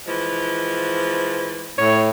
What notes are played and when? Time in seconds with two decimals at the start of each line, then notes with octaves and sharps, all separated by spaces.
0.07 E3 F3 G#3
1.78 A2 C#5